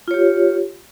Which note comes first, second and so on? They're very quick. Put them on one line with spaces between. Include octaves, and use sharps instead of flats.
F4 C#5 G4